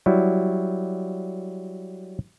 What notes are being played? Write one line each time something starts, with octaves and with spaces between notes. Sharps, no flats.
F#3 G3 E4